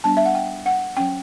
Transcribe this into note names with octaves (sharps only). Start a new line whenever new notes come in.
G3 B3 D4 A5
E5
F#5
G5
F#5
F#3 C#4 G5